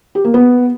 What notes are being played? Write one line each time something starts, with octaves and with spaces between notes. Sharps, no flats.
G4
A#3
B3